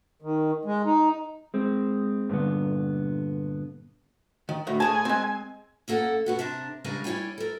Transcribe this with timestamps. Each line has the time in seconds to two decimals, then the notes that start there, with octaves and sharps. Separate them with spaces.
0.22 D#3
0.65 G#3
0.85 D#4
1.54 G#3 C4
2.29 G2 A#2 D3 B3
4.49 D#3
4.67 D2 A2
4.80 A2 G#4 G#5 A5
5.05 G#3 C4
5.88 F#2 A#3 A4 F#5
6.26 B2 B3 F#4
6.39 C3 D4 A#4 A5
6.84 C#3 G3 G#3 D4 A#4 G#5
7.04 G3 E4 C#5 D5 G5 G#5
7.38 A4 A#4